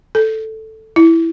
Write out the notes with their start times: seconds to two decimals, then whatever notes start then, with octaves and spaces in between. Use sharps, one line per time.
0.15 A4
0.96 E4